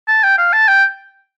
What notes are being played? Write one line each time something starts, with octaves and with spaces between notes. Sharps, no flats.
A5
G5
F5
A5
G5